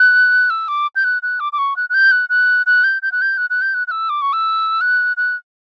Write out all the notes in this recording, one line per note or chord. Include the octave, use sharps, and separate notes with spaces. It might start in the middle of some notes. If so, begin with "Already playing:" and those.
Already playing: F#6
E6
D6
G6
F#6
F#6
D6
D6
C#6
F#6
F#6
G6
F#6
F#6
F#6
G6
G6
F#6
G6
F#6
F#6
G6
F#6
F#6
E6
D6
C#6
E6
F#6
F#6